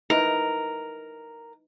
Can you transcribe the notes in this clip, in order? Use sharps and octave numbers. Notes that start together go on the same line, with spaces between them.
D#4 E4 A#4 B4